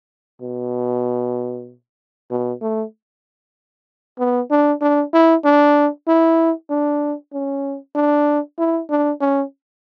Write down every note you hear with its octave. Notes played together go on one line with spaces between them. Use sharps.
B2
B2
A3
B3
D4
D4
E4
D4
E4
D4
C#4
D4
E4
D4
C#4